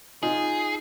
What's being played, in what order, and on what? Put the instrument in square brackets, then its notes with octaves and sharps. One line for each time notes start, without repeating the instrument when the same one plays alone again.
[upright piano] D#4 F4 [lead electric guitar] G#4